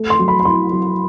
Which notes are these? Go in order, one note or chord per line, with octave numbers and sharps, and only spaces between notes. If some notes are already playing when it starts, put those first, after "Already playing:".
Already playing: A3
C6
F#3
B5
B5
E4 C6
F#3